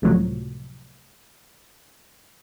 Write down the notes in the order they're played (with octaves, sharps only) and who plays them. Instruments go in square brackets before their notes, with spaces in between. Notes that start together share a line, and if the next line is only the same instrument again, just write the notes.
[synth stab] C#2 A2 C3 F3 F#3